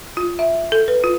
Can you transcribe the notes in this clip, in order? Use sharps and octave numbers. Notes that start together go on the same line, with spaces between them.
F4
E5
A4
B4
F4